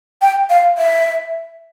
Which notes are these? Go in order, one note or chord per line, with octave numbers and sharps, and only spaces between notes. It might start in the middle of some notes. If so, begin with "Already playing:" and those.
G5
F5
E5